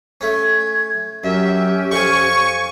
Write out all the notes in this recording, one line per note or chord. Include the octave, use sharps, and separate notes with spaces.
A3 C#4 G#6
F#2 C#4 G4 E5
F2 F3 G#5 C#6